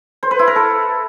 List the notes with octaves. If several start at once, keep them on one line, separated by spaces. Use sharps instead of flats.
C5
B4
E4
A#4
A4